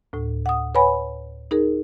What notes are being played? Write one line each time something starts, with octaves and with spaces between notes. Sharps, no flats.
D2 A2
F#5 D#6
B4 C#5 F#5 G#5 B5
D#4 G#4 A#4